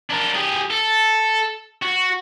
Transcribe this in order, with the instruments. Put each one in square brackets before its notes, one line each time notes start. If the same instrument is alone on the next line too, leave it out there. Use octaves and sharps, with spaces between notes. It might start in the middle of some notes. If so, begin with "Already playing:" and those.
[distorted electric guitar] D4 A#4
G4 G#4
A4
F#4